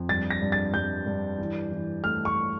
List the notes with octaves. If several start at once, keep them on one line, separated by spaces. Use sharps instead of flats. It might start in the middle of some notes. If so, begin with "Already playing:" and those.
Already playing: F2
G2 A6
A#6
G2
A6
G2 G6
G2
E3
E3
A3 F6
C#6